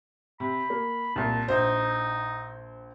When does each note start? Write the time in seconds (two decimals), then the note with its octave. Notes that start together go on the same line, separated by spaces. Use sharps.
0.40 C3 B5
0.70 A#3
1.16 C2 A#2 A5
1.48 A#1 D#4 C5